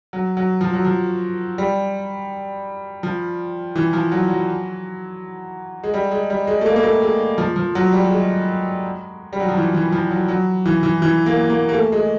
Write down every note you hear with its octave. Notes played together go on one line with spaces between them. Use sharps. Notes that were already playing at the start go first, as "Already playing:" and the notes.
F#3
F#3
F3
F#3
F3
G3
F3
E3
F3
F#3
F#3
G#3
G3
G#3
G3
G#3
A3
A#3
A#3
A3
G#3
F3
F3
F#3
G3
G#3
G3
F#3
F3
E3
E3
F3
F#3
F#3
E3
E3
E3
A#3
A#3
A#3
A3
G#3